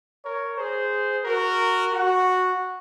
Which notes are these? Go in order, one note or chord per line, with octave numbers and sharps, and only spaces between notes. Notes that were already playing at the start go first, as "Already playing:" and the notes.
A#4 C#5
G#4 C5
F#4 A#4
F#4